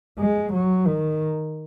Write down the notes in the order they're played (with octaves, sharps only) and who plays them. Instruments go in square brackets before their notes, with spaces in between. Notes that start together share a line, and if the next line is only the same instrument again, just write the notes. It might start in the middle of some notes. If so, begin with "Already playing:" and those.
[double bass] G#3
F#3
D#3